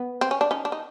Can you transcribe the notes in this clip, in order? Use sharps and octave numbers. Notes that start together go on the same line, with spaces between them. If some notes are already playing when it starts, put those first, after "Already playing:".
Already playing: B3
C4
C#4
D4
C#4 D#4
D4
D#4